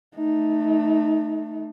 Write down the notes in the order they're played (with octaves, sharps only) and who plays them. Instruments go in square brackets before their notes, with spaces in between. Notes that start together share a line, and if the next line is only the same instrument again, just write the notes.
[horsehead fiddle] A3 D#4